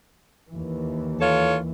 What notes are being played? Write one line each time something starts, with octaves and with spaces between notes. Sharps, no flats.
D#2 E3
F4 A4 C#5